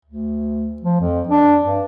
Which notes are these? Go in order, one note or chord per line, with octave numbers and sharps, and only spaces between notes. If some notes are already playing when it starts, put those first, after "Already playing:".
D2
F3
F2
D4
G2